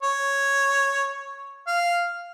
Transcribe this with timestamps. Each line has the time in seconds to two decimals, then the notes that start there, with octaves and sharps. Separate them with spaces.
0.03 C#5
1.67 F5